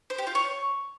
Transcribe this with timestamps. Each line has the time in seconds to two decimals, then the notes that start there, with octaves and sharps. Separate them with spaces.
0.10 C5
0.18 G4
0.27 F4
0.35 C#5